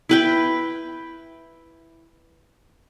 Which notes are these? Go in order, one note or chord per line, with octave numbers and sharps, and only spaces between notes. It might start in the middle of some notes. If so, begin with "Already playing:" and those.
E4 B4 G5